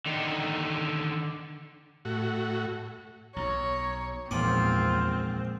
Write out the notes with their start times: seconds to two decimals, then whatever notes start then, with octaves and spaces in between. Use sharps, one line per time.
0.06 D3 D#3
2.05 A2 F#4
3.36 B1 C#5 A#5
4.31 A#1 E2 G#2 B3 C4 F4 D6